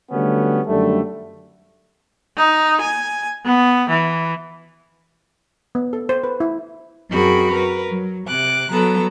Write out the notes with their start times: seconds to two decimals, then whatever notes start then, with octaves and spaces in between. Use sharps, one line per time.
0.12 D3 F#3 G3 A3 B3 C#4
0.67 F#2 D3 D#3 G3 A3
2.37 D#4
2.81 G#5
3.46 B3
3.89 E3
5.75 B3
5.93 A4
6.09 C5
6.24 B4
6.40 E4
7.10 F#2 C4 F#4 G#4 A#4 B5
7.52 A#4 B4
7.89 F#3
8.27 C3 D6 F#6
8.70 F#3 B3 A4 A#5